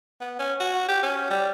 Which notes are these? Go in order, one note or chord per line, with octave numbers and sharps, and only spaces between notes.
B3
C#4
F#4
G4
C#4
G3